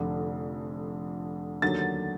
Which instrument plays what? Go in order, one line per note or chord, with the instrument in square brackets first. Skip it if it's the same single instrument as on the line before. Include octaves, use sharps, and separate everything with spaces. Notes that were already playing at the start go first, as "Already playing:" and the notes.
Already playing: [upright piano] F1 F2 D3
D#2 D3 F#3 A6